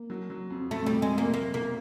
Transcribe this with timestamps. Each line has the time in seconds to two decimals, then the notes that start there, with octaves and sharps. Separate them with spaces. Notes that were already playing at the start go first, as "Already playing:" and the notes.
Already playing: A#3
0.10 F#3
0.30 F#3
0.50 F2
0.71 F2 A3
0.86 G3
0.92 C3
1.02 G#3
1.12 C3
1.18 A#3
1.34 F#3 A#3
1.54 B1 A#3